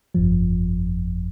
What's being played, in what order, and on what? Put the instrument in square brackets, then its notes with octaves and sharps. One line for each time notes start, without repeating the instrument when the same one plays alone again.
[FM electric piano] G1 F2 F3